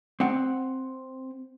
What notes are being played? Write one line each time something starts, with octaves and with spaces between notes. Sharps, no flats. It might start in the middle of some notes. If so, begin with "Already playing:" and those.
C4 F#5